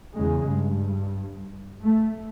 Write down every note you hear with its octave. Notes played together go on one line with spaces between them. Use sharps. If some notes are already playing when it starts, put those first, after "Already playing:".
E2 C#3 G#3
G2
A3